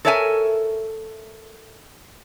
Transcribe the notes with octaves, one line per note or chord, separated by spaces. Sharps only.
A4 A#4 C#5 E5 F5 G#5